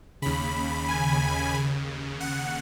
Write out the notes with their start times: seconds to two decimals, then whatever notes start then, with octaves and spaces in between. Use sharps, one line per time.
0.22 D#2 C#3 B5
0.89 G#5
1.55 D#2 C#3
2.20 F#5